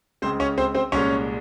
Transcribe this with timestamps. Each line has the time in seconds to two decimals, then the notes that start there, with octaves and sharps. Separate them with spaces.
0.22 C#2 C#3 G#3 C4 C5
0.40 C#4 C#5
0.58 C4 C5
0.75 C4 C5
0.92 C2 A#2 G#3 C#4 C#5